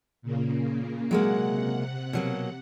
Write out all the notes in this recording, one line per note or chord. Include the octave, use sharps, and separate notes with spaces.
A#2 C#3 A#3
C3 F#3 G#3 A#3 F#5
B2 F#3 A#3